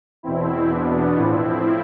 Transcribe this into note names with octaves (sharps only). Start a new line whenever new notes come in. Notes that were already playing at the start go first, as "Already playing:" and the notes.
E2 B2 C4 E4
E2 B2 B3 D4
A2 F3 C4 E4